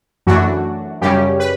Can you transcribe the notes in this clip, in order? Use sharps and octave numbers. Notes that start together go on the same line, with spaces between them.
F#2 E3 A3 D4 F#4
F#2 C#3 G3 C#4 G4
B4